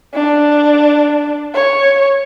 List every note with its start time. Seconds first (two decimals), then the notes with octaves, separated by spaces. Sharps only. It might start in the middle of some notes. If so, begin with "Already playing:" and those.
0.14 D4
1.54 C#5